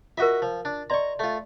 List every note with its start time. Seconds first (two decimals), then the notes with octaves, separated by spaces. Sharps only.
0.18 F4 F#4 A#4 D#5 E5
0.42 F3
0.65 D4
0.90 D5 D#5 A#5 C6 C#6
1.19 A3 F4